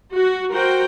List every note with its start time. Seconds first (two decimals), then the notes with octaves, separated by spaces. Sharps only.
0.13 F#4
0.52 F#4 A#4 C5 G5